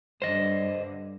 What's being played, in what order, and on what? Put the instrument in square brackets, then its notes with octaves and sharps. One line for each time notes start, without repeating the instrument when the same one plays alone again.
[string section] G2 D3 [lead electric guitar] C5 D#5